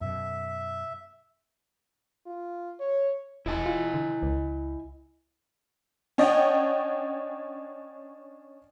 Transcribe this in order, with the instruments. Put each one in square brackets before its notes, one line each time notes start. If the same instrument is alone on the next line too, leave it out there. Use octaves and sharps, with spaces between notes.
[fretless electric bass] F#2 B2 [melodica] E5
[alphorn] F4
C#5
[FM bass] E1 [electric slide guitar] E4 D#5 G#5
[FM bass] F4
D3
C#2
[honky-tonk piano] C#4 D4 C#5 D#5 F#5 G5